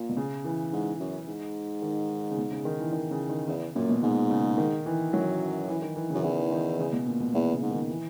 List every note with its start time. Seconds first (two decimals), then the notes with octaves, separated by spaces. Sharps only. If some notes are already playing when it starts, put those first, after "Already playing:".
Already playing: A#2
0.09 B2
0.17 C#3
0.44 E3
0.73 G#2
1.00 F#2
1.27 G#2
1.82 D#3
2.31 C#3
2.37 B2
2.51 C#3
2.65 D#3
2.79 E3
2.92 D#3
3.11 C#3
3.29 D#3
3.48 E2 C#3
3.75 F#2 A#2
3.89 B2
4.02 G#2 B2
4.31 C#3
4.58 D#3
4.86 E3
5.13 F#2 F#3
5.69 E3
5.82 D#3
5.96 E3
6.10 C#3
6.15 F#2
6.23 E2 D#3
6.51 D#3
6.79 C#3
6.93 B2
7.06 A#2
7.20 B2
7.34 E2 B2
7.52 C#3
7.62 G#2
7.71 D#3
7.89 E3